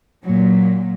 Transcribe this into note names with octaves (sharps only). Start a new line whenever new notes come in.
A#2 F#3